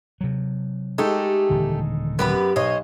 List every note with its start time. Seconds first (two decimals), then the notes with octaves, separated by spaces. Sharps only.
0.21 C3 F#3
0.98 G#3 A3 D#4 G4 A4
1.50 D#1 D3 E3
2.19 F#2 B3 G4 B4
2.56 B1 C5 C#5 D#5